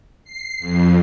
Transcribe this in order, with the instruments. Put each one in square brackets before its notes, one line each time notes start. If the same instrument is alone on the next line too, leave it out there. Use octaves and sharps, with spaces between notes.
[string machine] C7
F2